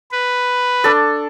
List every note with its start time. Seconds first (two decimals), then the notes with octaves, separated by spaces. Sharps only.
0.12 B4
0.84 D4 A4